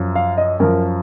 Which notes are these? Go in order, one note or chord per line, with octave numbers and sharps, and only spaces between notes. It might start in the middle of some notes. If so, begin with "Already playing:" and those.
Already playing: F#2 F3
F5
D#5
F#2 F3 A#4